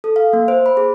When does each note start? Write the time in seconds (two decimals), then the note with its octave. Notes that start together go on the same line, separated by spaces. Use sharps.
0.04 A4
0.16 F5
0.33 A#3
0.48 C5
0.66 B5
0.77 G#4